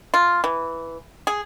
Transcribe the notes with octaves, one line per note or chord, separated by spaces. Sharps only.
F4
E3
G#4